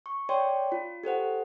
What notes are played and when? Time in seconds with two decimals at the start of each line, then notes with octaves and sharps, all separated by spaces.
0.06 C#6
0.29 C#5 D5 G5 C6
0.72 F4
1.04 G4 A4 C5 F#5